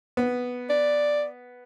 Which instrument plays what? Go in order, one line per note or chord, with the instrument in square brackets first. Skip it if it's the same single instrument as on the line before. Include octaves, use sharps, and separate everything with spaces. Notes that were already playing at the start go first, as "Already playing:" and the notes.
[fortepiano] B3
[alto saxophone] D5